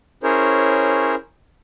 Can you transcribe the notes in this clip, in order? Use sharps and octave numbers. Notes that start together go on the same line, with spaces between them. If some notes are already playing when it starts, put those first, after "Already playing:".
C#4 E4 G#4 A#4 C5 C#5